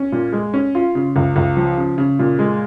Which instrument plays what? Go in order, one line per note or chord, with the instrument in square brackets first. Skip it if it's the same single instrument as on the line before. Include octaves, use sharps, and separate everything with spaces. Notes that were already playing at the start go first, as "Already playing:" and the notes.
Already playing: [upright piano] C#4
A#2
G#3
C#4
F4
C#3
C#2
C#2
F3
C#3
C#3
A#2
G#3